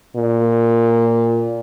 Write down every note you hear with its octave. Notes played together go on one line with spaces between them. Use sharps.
A#2